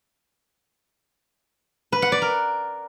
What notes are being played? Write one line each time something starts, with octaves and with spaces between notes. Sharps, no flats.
B4
F#5
D5
A#4